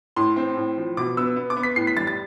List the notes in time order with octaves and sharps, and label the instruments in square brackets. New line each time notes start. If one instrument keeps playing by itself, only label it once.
[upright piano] A2 C6
C4
A2
F3
B2 D6
B3 E6
B3
D6
B3
B6
A2 C7
B6
G3 A6
A6